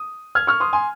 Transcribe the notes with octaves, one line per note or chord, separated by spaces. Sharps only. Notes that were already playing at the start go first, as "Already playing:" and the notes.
Already playing: D#6
F6 G#6
C#6 F6
C6 D#6
G#5 C6